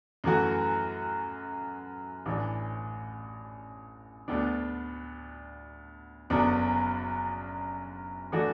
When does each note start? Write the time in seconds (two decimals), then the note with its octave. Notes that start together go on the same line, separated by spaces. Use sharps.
0.24 F#2 E3 A3 F#4
2.26 A1 A2 E3 D4
4.28 D2 D3 B3 D4
6.30 F#1 F#2 D3 B3 D4
8.32 E3 A3 D4 F#4